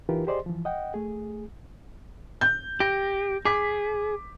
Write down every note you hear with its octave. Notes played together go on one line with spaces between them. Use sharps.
E3 D#4 F4 G4 A#4 B4
G4 G#4 C5 D5 D#5 C6
E3 F3
D#5 F#5 G5
A3 G#4
G6
G4 A#6
G#4 D6 B6